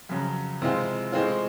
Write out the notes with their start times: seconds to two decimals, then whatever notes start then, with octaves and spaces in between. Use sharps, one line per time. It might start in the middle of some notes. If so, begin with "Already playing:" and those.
0.09 F2 C#3 F#3
0.62 C3 E3 G#3 C4 F4
1.12 A2 E3 G#3 C4 F4